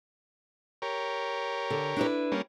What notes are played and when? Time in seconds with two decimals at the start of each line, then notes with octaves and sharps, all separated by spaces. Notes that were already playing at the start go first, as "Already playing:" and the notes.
0.82 G4 A#4 C#5
1.70 D3
1.97 D4 E4 B4
2.32 G3 A#3 C#4